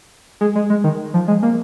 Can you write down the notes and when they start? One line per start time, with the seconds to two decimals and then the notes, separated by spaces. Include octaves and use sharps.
0.41 G#3
0.55 G#3
0.70 G#3
0.84 D#3
1.14 F3
1.28 G#3
1.43 A#3